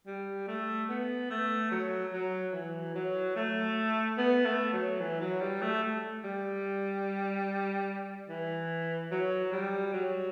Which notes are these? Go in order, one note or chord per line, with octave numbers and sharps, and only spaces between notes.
G3
A3
B3
A3
F#3
F#3
E3
F#3
A3
B3
A3
F#3
E3
F#3
G3
A3
G3
E3
F#3
G3
F#3